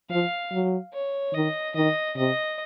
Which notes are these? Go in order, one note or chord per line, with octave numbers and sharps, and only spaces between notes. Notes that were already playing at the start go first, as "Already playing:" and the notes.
F3 F5
F#3
C#5
D#3 D#5
D#3 D#5
C3 D#5